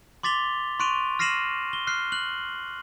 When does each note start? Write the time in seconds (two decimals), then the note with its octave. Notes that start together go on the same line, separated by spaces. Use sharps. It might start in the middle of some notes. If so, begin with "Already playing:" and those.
0.23 C6 D6 A6 B6 F7 G7
0.80 C6 C#6 F#6 D7 D#7 F7
1.19 F6 A#6 C7 D#7 E7 F#7
1.73 G7
1.87 F6 F#6 C7
2.12 F#6 F#7